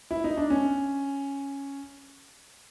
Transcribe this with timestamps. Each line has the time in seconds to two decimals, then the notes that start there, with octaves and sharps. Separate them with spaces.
0.11 E4
0.24 D#4
0.37 D4
0.50 C#4